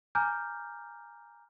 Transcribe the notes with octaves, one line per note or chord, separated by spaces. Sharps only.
G#5 A#5 D6 F6 G6